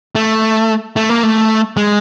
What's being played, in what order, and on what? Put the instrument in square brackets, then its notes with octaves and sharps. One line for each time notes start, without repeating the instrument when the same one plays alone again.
[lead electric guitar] A3
A3
A#3
A3
G#3